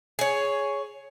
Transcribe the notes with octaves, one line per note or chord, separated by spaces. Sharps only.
G#4 C#5